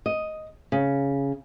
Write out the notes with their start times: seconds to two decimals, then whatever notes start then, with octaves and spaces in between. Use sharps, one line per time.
0.06 D#5
0.72 C#3